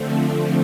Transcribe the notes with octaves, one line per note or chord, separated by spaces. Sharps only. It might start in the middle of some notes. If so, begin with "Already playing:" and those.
Already playing: D3 F3 A3 C4